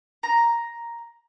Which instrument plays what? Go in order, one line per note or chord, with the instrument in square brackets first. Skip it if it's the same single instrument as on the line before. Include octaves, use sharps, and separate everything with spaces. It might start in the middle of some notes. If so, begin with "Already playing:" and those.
[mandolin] A#5